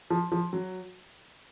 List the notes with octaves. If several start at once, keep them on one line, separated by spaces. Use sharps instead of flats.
F3
F3
F#3